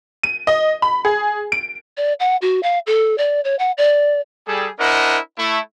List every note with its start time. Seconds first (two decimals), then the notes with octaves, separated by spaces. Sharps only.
0.23 D#7
0.47 D#5
0.82 B5
1.05 G#4
1.52 D7
1.97 D5
2.20 F#5
2.42 F#4
2.63 F5
2.87 A4
3.18 D5
3.44 C#5
3.59 F#5
3.78 D5
4.46 G3 G#4 A4
4.79 D4 E4 A#4 C5 D#5 F#5
5.38 A3 E4